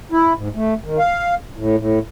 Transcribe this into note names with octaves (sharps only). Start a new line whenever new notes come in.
E4
G#2
A3
D#3
F5
A2
A2